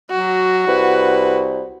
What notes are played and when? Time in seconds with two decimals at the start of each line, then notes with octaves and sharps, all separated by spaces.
0.11 F#3 F#4
0.68 C2 B4